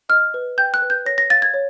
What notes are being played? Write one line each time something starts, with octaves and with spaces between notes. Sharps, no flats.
D#5 F6
B4
G5 G6
F#6
B4
G6
C#5 A#6
A#6
F5 A6
G#6
C#5